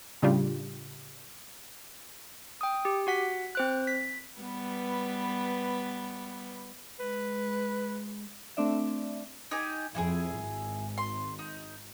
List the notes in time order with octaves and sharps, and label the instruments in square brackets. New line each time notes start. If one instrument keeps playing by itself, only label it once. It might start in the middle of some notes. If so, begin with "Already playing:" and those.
[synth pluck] A2 C#3 G3 D4 F4 G4
[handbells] G5 D#6
G4
F#4 F#5 B6
C4 C5 F#6
B6
[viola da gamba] G3 B3 B4
[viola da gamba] G#3 [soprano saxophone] B4
[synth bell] A3 C4 D4 D5 E5
[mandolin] D#4 G4 G#5
[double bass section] F2 [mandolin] E4 F#4 G#4
[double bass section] G#1
[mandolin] C6
D#4